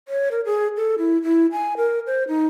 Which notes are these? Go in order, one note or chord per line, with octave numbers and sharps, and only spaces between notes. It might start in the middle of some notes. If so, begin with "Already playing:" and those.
C#5
A#4
G#4
A4
E4
E4
G#5
A#4
C5
D#4